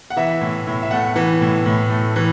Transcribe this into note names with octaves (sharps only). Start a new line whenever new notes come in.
F#5
E3 E5
A2
A2
E5
A3 F#5
E3
A2
A2
A3
E3